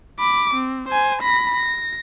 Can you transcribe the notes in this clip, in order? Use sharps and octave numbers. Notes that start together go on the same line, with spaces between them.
B5 D6
C4
C5 G#5
B5 A#6
A#6